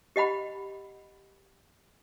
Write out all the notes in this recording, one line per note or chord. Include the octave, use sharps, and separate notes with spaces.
G4 D#5 F#5 B5